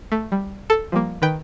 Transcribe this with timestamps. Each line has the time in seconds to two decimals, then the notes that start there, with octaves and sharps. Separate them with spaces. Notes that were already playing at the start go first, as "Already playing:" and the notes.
0.12 A3
0.32 G3
0.70 A4
0.92 F3 G3 A#3
1.22 D#3 B4 G5